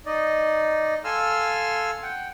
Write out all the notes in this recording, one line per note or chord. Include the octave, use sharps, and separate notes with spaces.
D#4 D5 D#5
A4 F5 G#5 C6 E6 F6
F#5 G5